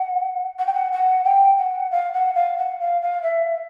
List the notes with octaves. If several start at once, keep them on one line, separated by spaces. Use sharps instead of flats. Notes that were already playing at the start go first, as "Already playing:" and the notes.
Already playing: F#5
F#5
G5
F#5
F#5
G5
F#5
F5
F#5
F5
F#5
F5
F5
E5